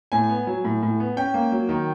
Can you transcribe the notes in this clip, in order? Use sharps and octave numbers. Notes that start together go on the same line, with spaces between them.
A2 G#5
B3
F#3
A2
A2
B3
C#4 G5
A#3
F#3
D#3